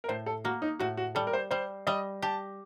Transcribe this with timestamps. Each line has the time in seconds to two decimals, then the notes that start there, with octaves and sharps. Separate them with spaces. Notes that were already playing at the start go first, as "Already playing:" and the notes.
0.04 A#4
0.09 A2 C5
0.26 A4
0.44 A#3 F#4
0.62 D#4
0.79 A2 F#4
0.97 F#4
1.15 G3 A4
1.27 A#4
1.33 C5
1.51 G3 C5
1.87 G3 D#5
2.22 G4 A5